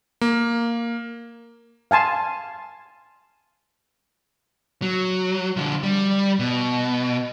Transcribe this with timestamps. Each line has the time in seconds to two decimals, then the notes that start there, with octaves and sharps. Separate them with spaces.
0.21 A#3
1.91 F5 G#5 A5 C6
4.82 F#3
5.57 D3 F3
5.83 G3
6.39 B2